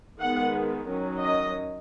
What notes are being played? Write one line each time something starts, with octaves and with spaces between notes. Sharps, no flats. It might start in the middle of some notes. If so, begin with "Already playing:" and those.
D#3 G#3 B3 F#5
D#3 F#3 C#4
D#5